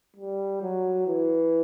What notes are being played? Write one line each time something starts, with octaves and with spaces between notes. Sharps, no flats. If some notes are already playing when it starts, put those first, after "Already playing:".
G3
F#3
E3